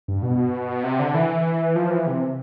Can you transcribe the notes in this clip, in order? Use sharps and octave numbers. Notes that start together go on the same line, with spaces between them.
G2
B2
C3
D3
E3
F3
E3
C3